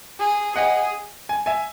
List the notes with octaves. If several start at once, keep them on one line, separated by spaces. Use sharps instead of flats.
G#4
G#4 D#5 F#5
G#5
E5 G#5